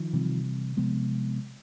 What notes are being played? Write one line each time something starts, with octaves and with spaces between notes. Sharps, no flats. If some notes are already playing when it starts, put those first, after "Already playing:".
Already playing: D#3 F3
C3 E3 G3 C4
C3 F3 G#3 B3